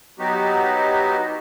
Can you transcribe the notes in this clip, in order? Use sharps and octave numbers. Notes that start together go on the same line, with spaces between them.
F#3 B3 D#4 F#4 G4